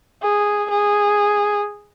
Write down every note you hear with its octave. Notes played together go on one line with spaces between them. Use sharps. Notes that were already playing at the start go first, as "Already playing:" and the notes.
G#4
G#4